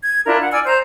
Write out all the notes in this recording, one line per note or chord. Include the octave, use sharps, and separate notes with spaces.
G#6
D4 E4 F4 A#4
F#5
D5 G#5 E6 F6
C5 A#5 G6